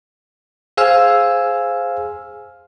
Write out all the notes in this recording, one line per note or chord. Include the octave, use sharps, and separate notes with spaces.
G#4 C5 F5 G#5 E6 F6